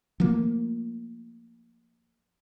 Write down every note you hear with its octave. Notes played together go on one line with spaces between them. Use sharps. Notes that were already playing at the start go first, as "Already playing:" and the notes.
F3 A3 A#3